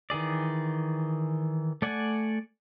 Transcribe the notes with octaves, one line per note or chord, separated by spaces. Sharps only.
D#3 E3 G#4 D5
A3 D5 F#5 G#5